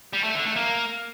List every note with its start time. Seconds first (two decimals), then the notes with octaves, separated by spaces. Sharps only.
0.13 G3
0.24 A3
0.35 D3
0.45 A3
0.56 A#3